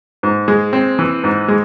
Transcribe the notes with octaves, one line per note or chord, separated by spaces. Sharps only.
G#2
G#3
C4
E3
G#2
G#3